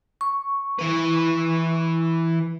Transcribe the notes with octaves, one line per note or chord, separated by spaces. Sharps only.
C#6
E3 B4